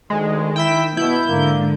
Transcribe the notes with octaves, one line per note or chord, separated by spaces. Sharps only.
D2 D#3 G#3
E4 G5 E6 B6
B2 B3 E4 G6
G#2 D3 A#3